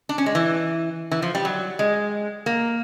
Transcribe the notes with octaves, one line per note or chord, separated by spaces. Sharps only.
D4
C#4
G#3
E3
E3
F3
G3
F#3
G#3
A#3